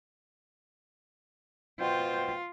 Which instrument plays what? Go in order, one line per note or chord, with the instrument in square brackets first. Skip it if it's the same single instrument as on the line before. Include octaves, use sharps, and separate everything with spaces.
[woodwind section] B2 C5 G5 [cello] F4